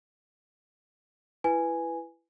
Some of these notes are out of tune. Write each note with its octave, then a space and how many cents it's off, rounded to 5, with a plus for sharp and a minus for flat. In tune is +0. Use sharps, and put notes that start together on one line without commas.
E4 +25 B4 +0 G#5 +0